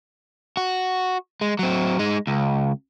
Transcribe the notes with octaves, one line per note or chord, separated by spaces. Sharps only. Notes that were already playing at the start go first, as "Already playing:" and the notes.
F#4
G#3
F#3 C4
G#3 D#4
C#2